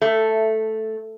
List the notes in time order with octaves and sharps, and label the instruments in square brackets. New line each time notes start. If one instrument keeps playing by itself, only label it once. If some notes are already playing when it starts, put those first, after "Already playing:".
[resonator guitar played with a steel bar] A3